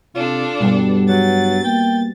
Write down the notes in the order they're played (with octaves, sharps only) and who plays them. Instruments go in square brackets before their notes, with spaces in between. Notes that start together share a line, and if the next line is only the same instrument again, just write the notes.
[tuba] C3 [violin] D4 A4 [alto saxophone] F4
[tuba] G2 [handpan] B2 G3
[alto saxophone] F#3 [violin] A6
[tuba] A#3 [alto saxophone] G5